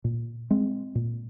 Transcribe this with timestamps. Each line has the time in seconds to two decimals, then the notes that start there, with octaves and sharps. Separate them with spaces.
0.04 A#2
0.51 G#3 C4
0.95 A#2